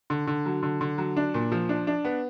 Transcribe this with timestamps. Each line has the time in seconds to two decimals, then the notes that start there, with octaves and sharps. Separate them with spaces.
0.10 D3
0.27 D3
0.46 F#3
0.63 D3
0.81 D3
0.98 F#3
1.17 D4
1.34 A#2
1.52 F3
1.69 D4
1.87 D4
2.05 B3